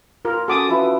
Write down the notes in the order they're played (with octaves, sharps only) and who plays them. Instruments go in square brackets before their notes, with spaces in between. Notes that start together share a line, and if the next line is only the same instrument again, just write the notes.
[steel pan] F4 A#4
[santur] C#4 F#4 [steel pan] A4 D6 D#6
[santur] F3 E4 B4